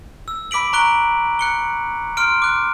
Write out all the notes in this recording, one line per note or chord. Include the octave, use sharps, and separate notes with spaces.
E6
B5 D6 B6 D7 F#7
A#5 C#6 F#6 D7 G7
F#6 C#7 G7
C6 F6 D7
D6 F#6